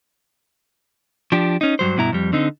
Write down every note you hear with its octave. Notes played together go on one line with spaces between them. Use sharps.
F3 D4 G4
C#4 D#4
G2 F#3 C5
G2 B2 E4 A#5
F2 G3
D3 C4 D#4